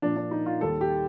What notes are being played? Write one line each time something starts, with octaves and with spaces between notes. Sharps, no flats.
A#2 F3 A#3 D4
D4
D#4
F4
D#2 D#3 G3 A4
G4